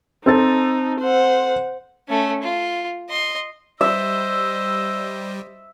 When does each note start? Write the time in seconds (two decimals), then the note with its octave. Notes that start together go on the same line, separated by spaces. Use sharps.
0.26 C4 D#4 A4 A6
1.00 C5 F#5
2.09 A3 C#4
2.42 F4
3.09 D#5 C6
3.81 G3 C5 D#5 E5 E6